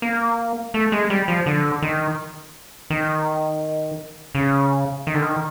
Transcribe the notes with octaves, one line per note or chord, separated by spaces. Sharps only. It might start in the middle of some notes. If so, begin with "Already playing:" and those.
A#3
A3
G#3
G3
F3
D3
D#3
D#3
C#3
D#3
D3
D#3